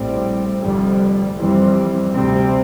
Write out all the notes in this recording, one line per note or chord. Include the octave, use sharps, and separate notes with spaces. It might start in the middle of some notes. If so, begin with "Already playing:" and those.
Already playing: A#1 A2 G3 C4
F1 F2 D3 G3
F2 E3 G3 C4
D2 C3 G3 C4